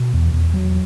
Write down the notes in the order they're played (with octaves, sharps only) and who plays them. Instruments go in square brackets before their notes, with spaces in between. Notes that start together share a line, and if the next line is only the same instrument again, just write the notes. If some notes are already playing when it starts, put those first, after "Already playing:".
Already playing: [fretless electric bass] B2
E2
E2
F#3